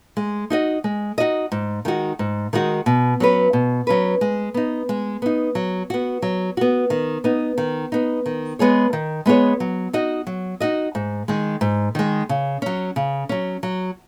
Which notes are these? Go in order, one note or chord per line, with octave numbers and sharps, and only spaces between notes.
G#3
D#4 F#4 D#5
G#3
D#4 F#4 D#5
G#2
D#3 G#3 D#4 F#4
G#2
D#3 G#3 D#4 F#4
B2
F#3 C#4 B4
B2
F#3 C#4 B4
G#3
B3 D#4
G#3
B3 D#4
F#3
B3 F#4
F#3
B3 F#4
D#3
B3 D#4
D#3
B3 D#4
D#3
G#3 B3 G#4 C#5
D#3
G#3 B3 G#4 C#5
F#3
D#4 F#4 D#5
F#3
D#4 F#4 D#5
G#2
D#3 G#3
G#2
D#3 G#3
C#3
F#3 C#4
C#3
F#3 C#4
F#3